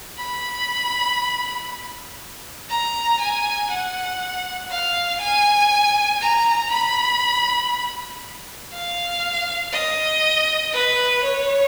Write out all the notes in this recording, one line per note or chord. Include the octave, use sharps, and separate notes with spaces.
B5
A#5
G#5
F#5
F5
G#5
A#5
B5
F5
D#5
B4
C#5